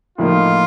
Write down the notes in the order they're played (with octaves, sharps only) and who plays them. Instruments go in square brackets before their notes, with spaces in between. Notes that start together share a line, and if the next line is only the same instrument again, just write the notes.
[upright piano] A2 F3 A#3 D#4 [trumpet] F4